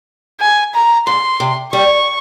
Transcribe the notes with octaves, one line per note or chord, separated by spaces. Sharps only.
G#5
A#5
G#2 C6
C3
G3 C#6